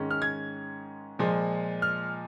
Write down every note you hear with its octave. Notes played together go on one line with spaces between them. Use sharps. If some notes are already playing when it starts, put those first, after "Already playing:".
Already playing: G#2 D#3 G#3 C#4
F6
G#6
A#2 F3 G#3
F6